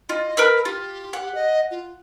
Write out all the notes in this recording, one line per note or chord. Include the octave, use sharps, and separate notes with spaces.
F4 D#5
A#4 B4 E6
F4 G4
F#5
D#5
F4